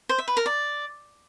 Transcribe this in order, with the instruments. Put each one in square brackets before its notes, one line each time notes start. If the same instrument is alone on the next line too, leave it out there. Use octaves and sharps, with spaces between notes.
[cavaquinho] C5
E5
B4
A#4
D5